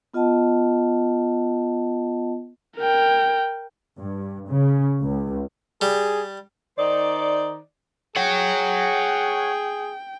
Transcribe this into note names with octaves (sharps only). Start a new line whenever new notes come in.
B3 F4 D#5 F#5 A5
A#4 G5
G2
C#3
C#2
G3 G#4
D#3 D#4 C5 D5
G#4 C#5 F#5 G5